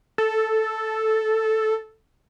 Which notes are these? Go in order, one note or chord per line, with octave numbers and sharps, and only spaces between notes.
A4